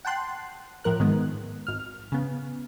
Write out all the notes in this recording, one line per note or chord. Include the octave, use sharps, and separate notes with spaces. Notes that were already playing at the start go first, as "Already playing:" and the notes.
F#5 G5 A5 C6 F#6
A2 F3 A#4 F#6
G#2 D#3 G#3 B3
G#1 F6
C#3 B3